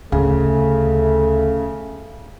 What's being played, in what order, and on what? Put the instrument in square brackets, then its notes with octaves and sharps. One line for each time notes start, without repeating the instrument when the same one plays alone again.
[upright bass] D2 [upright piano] C#3 [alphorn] A3